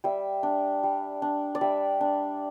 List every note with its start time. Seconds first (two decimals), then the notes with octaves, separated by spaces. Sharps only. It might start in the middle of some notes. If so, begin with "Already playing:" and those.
0.04 G3 E5
0.43 D4
0.83 G3
1.22 D4
1.55 D5
1.61 G3 E5
2.01 D4